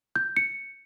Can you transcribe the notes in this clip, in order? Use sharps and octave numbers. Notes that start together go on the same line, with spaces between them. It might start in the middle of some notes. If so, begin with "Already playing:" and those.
G6
C#7